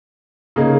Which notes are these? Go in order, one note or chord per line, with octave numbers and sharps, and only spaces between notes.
C#3 A#3 D#4 G#4